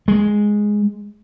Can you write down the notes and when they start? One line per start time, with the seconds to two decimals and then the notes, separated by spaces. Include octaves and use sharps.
0.08 G#3